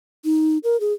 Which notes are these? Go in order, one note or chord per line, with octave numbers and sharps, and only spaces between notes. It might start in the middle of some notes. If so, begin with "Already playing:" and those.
D#4
A#4
G#4